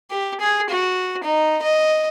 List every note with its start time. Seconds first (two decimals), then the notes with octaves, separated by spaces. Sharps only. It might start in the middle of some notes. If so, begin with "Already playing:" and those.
0.11 G4
0.41 G#4
0.70 F#4
1.24 D#4
1.63 D#5